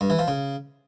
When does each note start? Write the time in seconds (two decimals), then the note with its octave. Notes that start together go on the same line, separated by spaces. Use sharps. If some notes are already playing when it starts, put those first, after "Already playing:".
0.01 G2
0.10 E3
0.19 F3
0.28 C#3